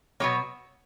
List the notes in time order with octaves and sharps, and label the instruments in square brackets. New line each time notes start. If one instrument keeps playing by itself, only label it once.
[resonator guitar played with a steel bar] B2 F#3 A#3 C#5